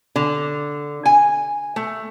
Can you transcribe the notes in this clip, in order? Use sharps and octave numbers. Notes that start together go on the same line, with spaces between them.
D3
G#5
A3